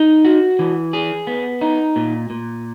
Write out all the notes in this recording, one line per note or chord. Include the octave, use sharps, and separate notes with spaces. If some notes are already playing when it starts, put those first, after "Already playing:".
Already playing: D#4
F#4
E3
G#4
B3
D#4
A#2
A#2